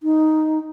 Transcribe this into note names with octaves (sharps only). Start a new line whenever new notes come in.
D#4